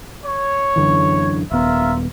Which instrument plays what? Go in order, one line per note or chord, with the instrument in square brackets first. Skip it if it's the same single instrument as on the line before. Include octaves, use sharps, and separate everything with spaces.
[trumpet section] C#5
[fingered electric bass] F#2 D3 E3
[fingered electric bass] D#1 B3 [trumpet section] F4 A#4 E5